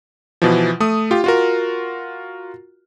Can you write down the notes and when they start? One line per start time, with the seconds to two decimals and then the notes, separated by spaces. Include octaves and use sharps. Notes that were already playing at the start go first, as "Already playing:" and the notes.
0.42 B2 E3 F3
0.80 A3 D#6
1.11 F4 G4
1.24 F4 F#4 A#4